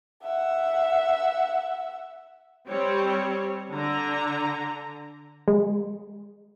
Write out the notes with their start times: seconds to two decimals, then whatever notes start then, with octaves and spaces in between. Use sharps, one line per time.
0.23 E5 F#5
2.69 G3 C4 C#5
3.71 D3 A#5
5.48 G#3